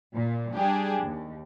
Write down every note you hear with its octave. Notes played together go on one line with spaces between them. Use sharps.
A#2
G3 D4 G4 G#4
D#2